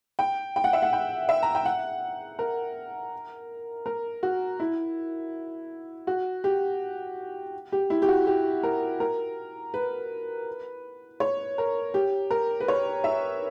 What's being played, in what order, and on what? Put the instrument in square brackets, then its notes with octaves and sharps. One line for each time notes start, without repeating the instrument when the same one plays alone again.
[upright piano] G5
G5
F#5
E5
F#5
G5
E5
A#5
G5
F#5
A#4
A#4
F#4
E4
F#4
G4
G4
E4
G4
F#4
G4
A#4
A#4
B4
C#5
A#4
G4
A#4
B4
C#5
E5